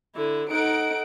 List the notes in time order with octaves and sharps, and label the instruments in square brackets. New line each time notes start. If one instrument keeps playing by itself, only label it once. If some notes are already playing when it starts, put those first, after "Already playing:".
[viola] D3 E4
[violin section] D#4 D7 [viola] A4 F#5